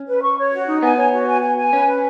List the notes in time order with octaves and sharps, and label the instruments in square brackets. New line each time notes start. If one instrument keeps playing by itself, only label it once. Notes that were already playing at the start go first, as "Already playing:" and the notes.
Already playing: [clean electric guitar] C#4
[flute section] B4
C#6
C#5
F#4
D#4
[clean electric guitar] B3 [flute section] G#5
[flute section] C#5
F#4
G#5
G#5
G#5
[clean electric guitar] C#4 [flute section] B4
[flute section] B4